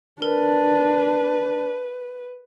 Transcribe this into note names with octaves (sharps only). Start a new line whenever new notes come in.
D4 A#4 B4